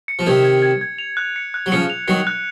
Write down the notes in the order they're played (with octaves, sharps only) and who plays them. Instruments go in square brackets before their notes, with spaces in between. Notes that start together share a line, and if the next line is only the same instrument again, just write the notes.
[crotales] C#7
[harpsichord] F3
[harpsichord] C3 D#3 [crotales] G#6
[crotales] G#6
G#6
G#6
F7
F#6
C#7
F#6
[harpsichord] F#3
[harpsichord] C#3 F3 [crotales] C#7
[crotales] F7
[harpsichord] D#3 F#3 [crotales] C#7
[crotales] F#6